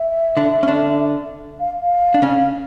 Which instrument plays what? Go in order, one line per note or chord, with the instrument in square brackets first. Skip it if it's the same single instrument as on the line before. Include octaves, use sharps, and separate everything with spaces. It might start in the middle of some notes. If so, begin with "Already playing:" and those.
Already playing: [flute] E5
[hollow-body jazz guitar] D3 D4
C#4
D3 D4
[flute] F5
F5
[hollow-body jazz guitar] D4
C#3 C#4